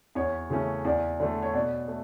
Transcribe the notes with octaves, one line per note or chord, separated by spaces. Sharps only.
E2 C#5
C#3 E3 A3 C#4
E2 D5
D3 A3
C#5
B2 D5
A3